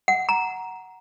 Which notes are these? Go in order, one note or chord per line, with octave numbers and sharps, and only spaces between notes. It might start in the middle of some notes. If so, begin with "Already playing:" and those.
F#5
A#5